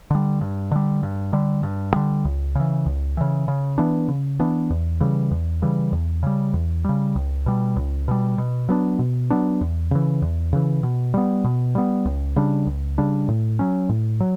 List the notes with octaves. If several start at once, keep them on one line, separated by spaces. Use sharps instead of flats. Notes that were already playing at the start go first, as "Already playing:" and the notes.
D3 G3
G2
D3 G3
G2
D3 G3
G2
D3 G3
C#2
C#3 E3
C#2
C#3 E3
C#3
E3 B3 D4
C#3
E3 B3 D4
E2
C#3 E3 G3
E2
C#3 E3 G3
E2
C#3 G3
E2
C#3 G3
C#2
B2 G3
C#2
B2 G3
B2
F#3 B3 D4
B2
F#3 B3 D4
E2
C#3 E3
E2
C#3 E3
B2
G3 B3
B2
G3 B3
C#2
C#3 G3 D4
C#2
C#3 G3 D4
A2
F#3 C#4
A2
F#3